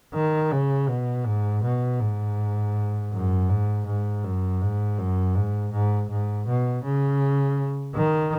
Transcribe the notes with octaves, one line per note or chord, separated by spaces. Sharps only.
D#3
C#3
B2
G#2
B2
G#2
F#2
G#2
G#2
F#2
G#2
F#2
G#2
G#2
G#2
B2
C#3
D#3